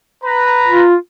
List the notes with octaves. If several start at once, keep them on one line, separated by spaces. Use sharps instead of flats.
B4 A#5
F4